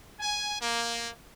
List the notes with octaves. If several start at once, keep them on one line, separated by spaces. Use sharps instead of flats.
G#5
A#3